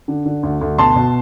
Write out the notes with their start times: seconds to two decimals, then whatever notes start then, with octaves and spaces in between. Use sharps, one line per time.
0.08 D3
0.26 D3
0.43 D2
0.61 D2
0.78 B2 A5 C6
0.95 B2